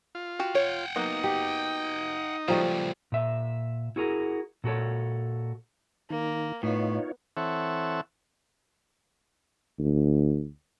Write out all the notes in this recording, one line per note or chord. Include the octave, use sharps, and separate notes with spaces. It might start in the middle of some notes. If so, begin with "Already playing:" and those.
F4
F#4 G4
C#5 F#5 G5
F#3 A#3 B3 D#4
G4
C#2 A#2 F3 G3 A3 A#5
A#2 E5
E4 F#4 G#4 A#4
A#2 F#4 A4 C#5
D#3 A#3
A2 B3 D#4 F4 C#5
E3 C4 A4 C#5 E5 F#5
D2